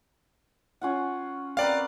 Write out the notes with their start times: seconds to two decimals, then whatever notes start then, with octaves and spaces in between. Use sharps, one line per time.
0.81 C#4 F4 F#5
1.57 C4 A#4 B4 D5 F5